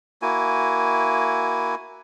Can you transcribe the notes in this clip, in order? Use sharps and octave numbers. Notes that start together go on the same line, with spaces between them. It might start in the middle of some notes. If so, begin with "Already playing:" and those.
A#3 E4 F#4 G#5